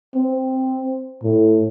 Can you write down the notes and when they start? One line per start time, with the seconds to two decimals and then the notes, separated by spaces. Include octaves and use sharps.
0.15 C4
1.23 A2